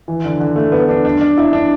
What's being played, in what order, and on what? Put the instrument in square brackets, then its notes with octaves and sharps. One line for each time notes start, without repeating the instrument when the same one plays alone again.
[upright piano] E3
D3
D3
A3
B3
D4
D4
D4
E4
D4